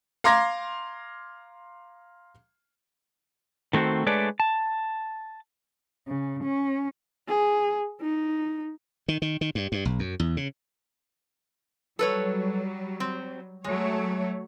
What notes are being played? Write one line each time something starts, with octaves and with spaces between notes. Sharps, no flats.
F5 A#5 C6 D6 G#6 A#6
D#3 A3 C4 F#4 C5
G#3 A3 D4 B4 C#5 D5
A5
C#3
C#4
G#4
D#4
D#3
D#3
D#3
G2
G2
B1
F#2
E2
C#3
F#3 G3 A4 B4 C#5
C4
F#3 G#3 A3 C#5